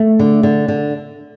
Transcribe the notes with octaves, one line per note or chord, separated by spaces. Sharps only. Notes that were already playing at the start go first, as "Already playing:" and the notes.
Already playing: A3
D3
D3
D3